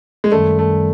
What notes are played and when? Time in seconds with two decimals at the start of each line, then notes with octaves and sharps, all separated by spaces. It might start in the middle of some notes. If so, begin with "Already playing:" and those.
0.24 G#3
0.31 F#2 D#3 G3 A3
0.59 A3